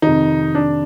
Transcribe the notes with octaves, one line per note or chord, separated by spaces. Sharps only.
F2 C3 D#3 D#4
D4